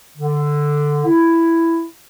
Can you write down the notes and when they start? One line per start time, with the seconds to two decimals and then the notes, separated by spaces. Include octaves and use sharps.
0.17 D3
1.05 E4